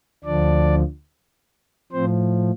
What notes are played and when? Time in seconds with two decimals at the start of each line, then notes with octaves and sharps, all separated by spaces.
0.24 D2 D3 F3 D4 D5
1.92 A2 F3 C4 C5